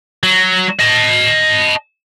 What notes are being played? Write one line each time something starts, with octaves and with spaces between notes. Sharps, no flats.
F#3
D#5 A5